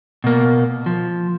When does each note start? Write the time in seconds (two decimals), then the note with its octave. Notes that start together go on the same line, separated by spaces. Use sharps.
0.24 B2 A#3
0.86 F3